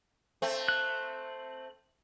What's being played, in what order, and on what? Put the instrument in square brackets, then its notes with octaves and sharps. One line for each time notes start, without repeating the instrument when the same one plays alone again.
[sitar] A3 C4
[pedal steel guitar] F#6